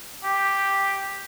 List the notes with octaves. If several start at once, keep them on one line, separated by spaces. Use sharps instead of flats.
G4